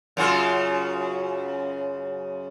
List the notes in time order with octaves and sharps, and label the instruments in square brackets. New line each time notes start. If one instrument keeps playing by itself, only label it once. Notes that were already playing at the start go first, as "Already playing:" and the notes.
[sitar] F#2 C#3 F4